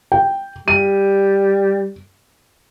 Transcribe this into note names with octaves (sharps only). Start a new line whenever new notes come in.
G5
G3 D#7